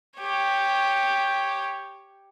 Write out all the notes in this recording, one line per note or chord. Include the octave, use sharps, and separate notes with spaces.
G4 C#5